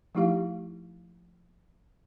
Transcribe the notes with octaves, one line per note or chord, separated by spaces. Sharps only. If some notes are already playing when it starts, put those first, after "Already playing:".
F3 A3 D#4 E4 G4 F5